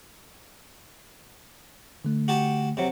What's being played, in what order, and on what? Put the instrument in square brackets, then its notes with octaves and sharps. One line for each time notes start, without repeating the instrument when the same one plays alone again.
[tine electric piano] D3 A3
[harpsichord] F#4 G4 A5
C3 F#3